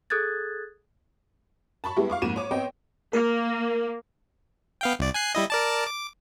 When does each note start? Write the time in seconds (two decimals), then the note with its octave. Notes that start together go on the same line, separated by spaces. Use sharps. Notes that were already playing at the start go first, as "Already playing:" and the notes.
0.10 G#4 A4 D#6 F#6 G#6 A6
1.84 A5 B5 C#6
1.96 G3 G#3 B3 E4 G4
2.10 F5 C#6 D6
2.22 F2 G#2 A#3 D#7 E7
2.36 C#5 D6
2.51 B3 C4 C#5 D#5 G5
3.13 A#3 A#4
4.81 B3 F5 G5
4.99 C2 D5
5.14 G#5 F#6 C7
5.35 G3 E4 D#5
5.50 A#4 D5 A5
5.87 D6